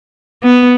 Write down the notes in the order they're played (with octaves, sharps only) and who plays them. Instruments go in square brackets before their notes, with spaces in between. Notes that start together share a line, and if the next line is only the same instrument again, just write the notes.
[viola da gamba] B3